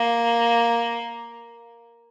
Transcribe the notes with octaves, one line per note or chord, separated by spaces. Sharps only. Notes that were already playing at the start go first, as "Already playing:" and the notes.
Already playing: A#3